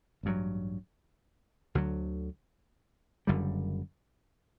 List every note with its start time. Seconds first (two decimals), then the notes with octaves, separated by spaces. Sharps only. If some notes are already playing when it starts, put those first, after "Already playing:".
0.23 A1 G2 F#3
1.75 D2 D3 F#3
3.27 F#1 F#2 D3 G3